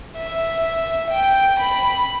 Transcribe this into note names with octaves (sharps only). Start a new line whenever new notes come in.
E5
G5
B5